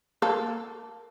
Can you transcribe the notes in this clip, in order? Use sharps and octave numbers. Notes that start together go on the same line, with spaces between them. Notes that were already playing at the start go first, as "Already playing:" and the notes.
A#3 A4